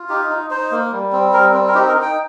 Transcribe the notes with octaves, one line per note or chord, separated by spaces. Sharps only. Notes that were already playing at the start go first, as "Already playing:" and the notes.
Already playing: F4
D#4 G4
D#4
D#4 C5
A#3
G3
C4
G3 A#4
C4
A#4
D#4 G4
A#4
D#4
G5